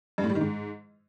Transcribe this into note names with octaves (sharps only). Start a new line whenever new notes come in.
G2
A2
G3
D#3
G#2